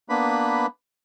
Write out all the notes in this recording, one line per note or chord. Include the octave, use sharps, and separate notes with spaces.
A#3 B3 D4 B4 B5